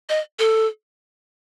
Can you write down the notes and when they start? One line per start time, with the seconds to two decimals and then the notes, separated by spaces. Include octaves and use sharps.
0.09 D#5
0.39 A4